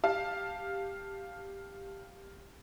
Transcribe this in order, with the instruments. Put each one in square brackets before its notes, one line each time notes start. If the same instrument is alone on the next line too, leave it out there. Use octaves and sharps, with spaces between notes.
[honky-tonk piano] G4 F5 A5